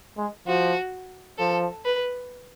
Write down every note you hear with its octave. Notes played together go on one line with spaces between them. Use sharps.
G#3
F3 F#4
F3 A4
B4